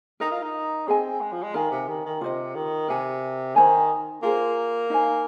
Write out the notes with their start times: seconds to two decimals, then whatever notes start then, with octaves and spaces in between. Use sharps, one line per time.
0.20 D#4 A#4 D#5 A#5
0.31 F4
0.42 D#4
0.87 C4 G#4 D#5 G#5
1.21 G#3
1.32 F3
1.43 G#3
1.54 D#3 D#4 A#4 F5 G#5
1.71 C3
1.88 D#3
2.05 D#3
2.21 C3 F4 C5 D#5
2.55 D#3
2.88 C3 A#4 G#5
3.56 D#3 D#4 C5 G#5
4.23 A#3 F4 G#4 C5
4.90 D#4 C5 F5 G#5